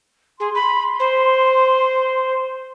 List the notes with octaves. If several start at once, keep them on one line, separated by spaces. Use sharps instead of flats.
G#4 C6
B5
C5